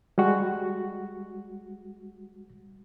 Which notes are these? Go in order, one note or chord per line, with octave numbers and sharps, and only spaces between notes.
G3 G#3 F#4